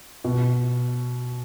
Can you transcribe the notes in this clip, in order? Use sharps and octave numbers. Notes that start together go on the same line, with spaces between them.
B2